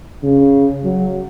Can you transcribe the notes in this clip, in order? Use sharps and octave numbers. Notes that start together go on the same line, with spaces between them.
C#3
F#3